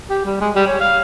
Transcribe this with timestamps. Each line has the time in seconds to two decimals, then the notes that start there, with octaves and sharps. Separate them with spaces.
0.10 G4
0.25 G3
0.41 G#3
0.56 G3
0.67 C#5
0.81 F5